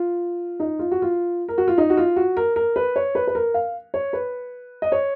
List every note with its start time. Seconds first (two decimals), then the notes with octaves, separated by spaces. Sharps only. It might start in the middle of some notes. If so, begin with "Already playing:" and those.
Already playing: F4
0.60 D#4
0.79 F4
0.92 F#4
1.02 F4
1.49 A#4
1.58 F#4
1.68 F4
1.78 D#4
1.90 F#4
1.97 F4
2.16 F#4
2.37 A#4
2.56 A#4
2.76 B4
2.96 C#5
3.15 B4
3.27 B4
3.35 A#4
3.54 F5
3.94 C#5
4.13 B4
4.82 D#5
4.92 C#5